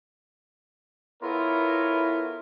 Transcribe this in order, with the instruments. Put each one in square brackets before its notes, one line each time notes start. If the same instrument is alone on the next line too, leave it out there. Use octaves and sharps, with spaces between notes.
[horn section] B3 E4 F4 A4 A#4 C#5